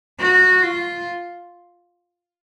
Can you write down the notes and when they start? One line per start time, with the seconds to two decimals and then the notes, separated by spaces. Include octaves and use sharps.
0.19 F#4
0.62 F4